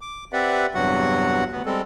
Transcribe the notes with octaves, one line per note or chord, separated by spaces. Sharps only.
D6
C4 G4 B4 D5 E5 F#5
E2 G2 C3 F#3 F#4 F#5
D2 B3
G3 G#3 C4 A4